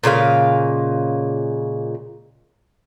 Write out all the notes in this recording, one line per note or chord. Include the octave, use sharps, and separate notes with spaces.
A#2 C#3 G#3 F5